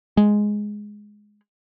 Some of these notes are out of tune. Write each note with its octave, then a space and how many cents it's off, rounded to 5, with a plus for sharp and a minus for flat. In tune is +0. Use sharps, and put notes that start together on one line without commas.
G#3 +5